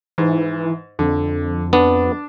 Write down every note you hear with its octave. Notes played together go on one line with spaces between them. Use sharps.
G#2 E3
F2 D3
B3 D4